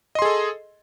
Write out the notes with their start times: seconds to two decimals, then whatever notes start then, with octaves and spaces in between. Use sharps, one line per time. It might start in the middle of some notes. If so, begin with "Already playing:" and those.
0.15 D#5
0.19 C6
0.22 G#4
0.25 A4